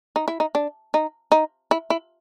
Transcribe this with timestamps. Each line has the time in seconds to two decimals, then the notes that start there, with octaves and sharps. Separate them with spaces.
0.16 D#4
0.28 E4
0.40 D#4
0.55 D4
0.94 D#4
1.32 D#4
1.71 E4
1.90 E4